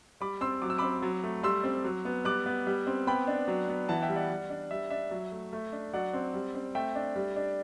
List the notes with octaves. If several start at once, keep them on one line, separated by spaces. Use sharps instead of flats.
G3 B5 D6
C4 C6 E6
F#3 D6
E6
C4 B5 D6
F#3
A3
G3 C6 E6
C4
F#3
B3
G3 D6 F#6
B3
G3
C4
B3 G5 B5
D4
F#3
B3
E3 F#5 A5
E5 G5
G3
D5 F#5
G3
D4
G3 E5
D4 E5
F#3
A3
A3
D4
F#3 D5 F#5
C4
G3
C4
A3 E5 G5
D4
G3
D4